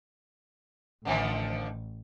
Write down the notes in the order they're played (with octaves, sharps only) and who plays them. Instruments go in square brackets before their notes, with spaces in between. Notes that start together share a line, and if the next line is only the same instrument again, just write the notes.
[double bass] A1 [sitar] D3 D#3 F3